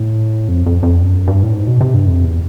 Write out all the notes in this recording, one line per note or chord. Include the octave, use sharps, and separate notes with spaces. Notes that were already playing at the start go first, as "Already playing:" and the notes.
Already playing: A2
F2
F2
F2
F#2
G2
A2
G#2
B2
C3
G2
F2
E2